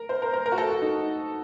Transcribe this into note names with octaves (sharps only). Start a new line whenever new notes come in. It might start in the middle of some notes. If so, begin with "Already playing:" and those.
Already playing: A#4
C5
A#4
A#4
A#4
F#4
A4
F#4
D#4